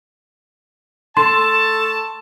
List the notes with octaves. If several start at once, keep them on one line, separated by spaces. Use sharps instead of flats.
A3 A4 A5 C6